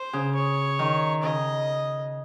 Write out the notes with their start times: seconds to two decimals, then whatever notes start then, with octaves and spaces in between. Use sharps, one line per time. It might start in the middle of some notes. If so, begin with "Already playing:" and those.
Already playing: C5
0.13 C#3
0.35 C#5
0.79 D#3
1.23 C#3 D#5